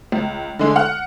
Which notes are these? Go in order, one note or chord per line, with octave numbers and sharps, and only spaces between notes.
C#2
D3 G#3 A3
F#5 F6 F#6